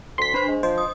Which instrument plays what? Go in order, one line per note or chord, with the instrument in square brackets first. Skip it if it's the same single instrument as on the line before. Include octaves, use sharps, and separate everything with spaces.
[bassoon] D2 [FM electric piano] C6 B6
[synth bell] D4 C5 [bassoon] B4
[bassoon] G#3
[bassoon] F3 [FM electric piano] C5 [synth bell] D#5
[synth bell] D#6